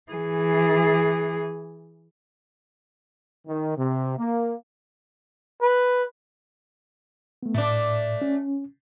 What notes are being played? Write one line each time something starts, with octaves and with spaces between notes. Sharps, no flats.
E3 G#4
D#3
C3
A#3
B4
A3 B3
A2 A3 D4
C#4